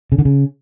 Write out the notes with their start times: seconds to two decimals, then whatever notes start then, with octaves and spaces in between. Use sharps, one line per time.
0.12 C#3
0.19 D3
0.25 C#3